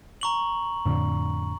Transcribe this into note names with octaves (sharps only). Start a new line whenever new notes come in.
A#5 C#6 F#7
F2 A2 D3